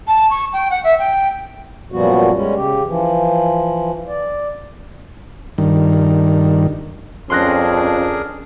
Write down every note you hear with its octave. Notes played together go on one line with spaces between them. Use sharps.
A5
C#6
G5
F#5
E5
G5
F#2 A#2 F3 G3 B3 F#4
G3 G#3 C#4
C#3 G4
E3 F3
D5
G2 D#3
F2 C#4 D4 G#4 A#4 C6 F#6 A#6